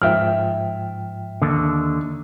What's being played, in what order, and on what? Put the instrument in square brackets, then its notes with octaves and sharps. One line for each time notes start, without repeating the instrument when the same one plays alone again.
[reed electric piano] G#2 F3 G5 [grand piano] E5 F6
[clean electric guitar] D#2 D3